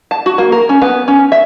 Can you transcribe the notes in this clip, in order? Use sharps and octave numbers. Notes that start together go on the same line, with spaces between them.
A5
F#4
A#3
A#4
C#4
B3
C#4
E5